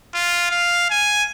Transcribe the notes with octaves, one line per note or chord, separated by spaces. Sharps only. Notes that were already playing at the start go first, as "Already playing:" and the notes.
F4
F5
G#5